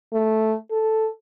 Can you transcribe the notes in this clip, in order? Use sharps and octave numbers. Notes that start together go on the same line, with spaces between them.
A3
A4